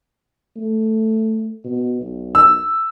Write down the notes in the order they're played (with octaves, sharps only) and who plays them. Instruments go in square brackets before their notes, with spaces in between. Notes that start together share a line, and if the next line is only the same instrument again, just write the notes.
[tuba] A3
B2
B1
[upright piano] E6